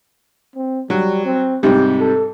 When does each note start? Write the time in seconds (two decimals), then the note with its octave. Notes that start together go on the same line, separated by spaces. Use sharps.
0.56 C4
0.90 F#3 G3
1.25 C4
1.63 G#2 C3 G3 G4
1.99 A4